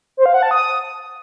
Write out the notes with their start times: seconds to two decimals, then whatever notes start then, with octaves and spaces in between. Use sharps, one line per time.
0.17 C5
0.26 F5
0.34 F#5
0.43 A5
0.51 D#6